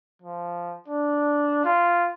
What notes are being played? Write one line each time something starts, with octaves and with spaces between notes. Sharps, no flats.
F3
D4
F4